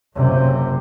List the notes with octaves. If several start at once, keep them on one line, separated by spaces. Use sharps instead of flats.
F#1 C3